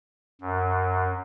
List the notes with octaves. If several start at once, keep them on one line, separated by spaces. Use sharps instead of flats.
F#2